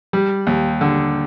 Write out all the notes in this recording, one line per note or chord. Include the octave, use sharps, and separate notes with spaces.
G3
D#2
D3